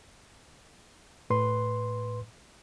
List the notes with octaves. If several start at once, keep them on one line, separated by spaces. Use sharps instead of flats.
A2 B4 C6